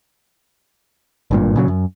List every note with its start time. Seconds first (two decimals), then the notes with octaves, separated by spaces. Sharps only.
1.31 G#1 G2 A#2
1.56 A#2 C#3 F#3
1.68 F#2